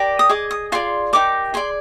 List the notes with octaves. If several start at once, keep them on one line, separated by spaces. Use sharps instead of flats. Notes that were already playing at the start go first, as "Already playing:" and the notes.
Already playing: G4 A#4 D5
D#6
G#4 D#5 D6
D#6
F4 G#4 D5 C6
D#4 G4 A#4 D6
G#4 D5 C6